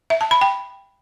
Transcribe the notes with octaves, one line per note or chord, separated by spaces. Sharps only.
E5
A5
B5
G5